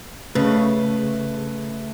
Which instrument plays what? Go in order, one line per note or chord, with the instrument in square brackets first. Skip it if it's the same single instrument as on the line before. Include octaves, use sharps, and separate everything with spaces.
[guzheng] C#3 [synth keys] A3 [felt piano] B4